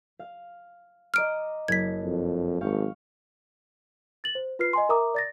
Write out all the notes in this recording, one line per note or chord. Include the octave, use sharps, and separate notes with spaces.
F5
D#5 A#5 D6 F6 D7
F#1 G#6 A6 B6
F2
G#1 F5 G5 C#6
A6 F#7
C5
F4 B4 F6 C7
D#5 G#5 C6
A#4 E5 A#5 D6 D#6
D5 A6 A#6